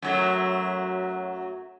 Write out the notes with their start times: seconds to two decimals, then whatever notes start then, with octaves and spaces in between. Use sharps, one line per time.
0.02 F#2 F#3 A3